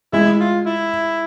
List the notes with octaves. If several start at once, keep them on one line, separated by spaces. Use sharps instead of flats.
G#3 E4
F4
E4